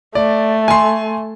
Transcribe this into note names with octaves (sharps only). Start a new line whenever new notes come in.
A3 D5
G#5 C6